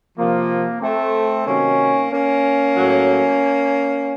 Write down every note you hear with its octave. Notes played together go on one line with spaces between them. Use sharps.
C3 F3 A#3
A3 C4
C3 D#3 F#3 A#3 C#4
A#3 C#4
A2 F#3